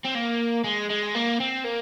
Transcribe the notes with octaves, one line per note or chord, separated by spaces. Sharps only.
C4
A#3
G#3
G#3
A#3
C4
A#3